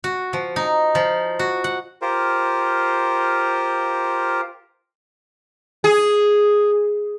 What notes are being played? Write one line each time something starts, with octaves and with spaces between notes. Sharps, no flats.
F#4
F3
D#4
F3
F#4
F#5
F4 G4 A#4 C5
G#4